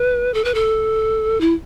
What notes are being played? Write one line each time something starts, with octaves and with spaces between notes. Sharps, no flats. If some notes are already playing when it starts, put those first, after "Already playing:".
Already playing: B4
A4
B4
A4
E4